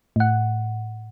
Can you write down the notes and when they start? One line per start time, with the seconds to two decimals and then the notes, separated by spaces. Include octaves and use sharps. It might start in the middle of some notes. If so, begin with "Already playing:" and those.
0.16 A2 F#5